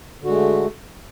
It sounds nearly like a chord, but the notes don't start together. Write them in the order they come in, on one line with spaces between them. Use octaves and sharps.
D3 F#4 G#3 A3